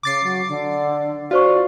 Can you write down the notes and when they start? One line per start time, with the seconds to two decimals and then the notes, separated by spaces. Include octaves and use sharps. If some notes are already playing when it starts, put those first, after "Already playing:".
0.03 C#3 D6 A6 C7
0.23 F#3
0.48 D3
1.31 F4 F#4 C5 D5 C#6